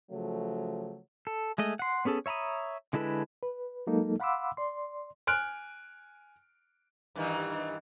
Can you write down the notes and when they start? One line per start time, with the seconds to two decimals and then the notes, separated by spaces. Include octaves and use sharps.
0.11 C#3 F3 F#3 A3
1.27 A4
1.58 G#3 A3 D#5
1.79 F#5 C6
2.05 B3 C#4 G#4 A4
2.26 C#5 E5 A#5 B5 D#6
2.93 D3 G#3 E4 A4 B4
3.43 B4
3.87 F#3 G#3 A#3 D#4 A4
4.20 F5 F#5 B5 C6 D6 E6
4.57 D5 C6
5.27 G#5 F6 F#6 D7
7.16 G2 D#3 E3